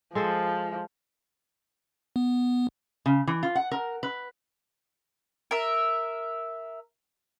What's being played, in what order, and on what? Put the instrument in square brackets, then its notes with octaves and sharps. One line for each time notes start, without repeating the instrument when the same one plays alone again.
[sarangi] F3 [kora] G#3 A4 C5
[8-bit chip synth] B3
[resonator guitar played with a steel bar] C#3
E3
F4
F#5
A#4
B4
[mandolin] A#4 E5